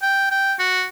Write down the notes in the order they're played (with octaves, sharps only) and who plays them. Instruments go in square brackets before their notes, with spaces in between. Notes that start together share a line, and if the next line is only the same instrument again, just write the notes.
[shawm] G5
G5
F#4